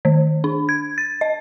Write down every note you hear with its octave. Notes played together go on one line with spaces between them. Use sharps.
D#3
D4
G#6
A6
D#5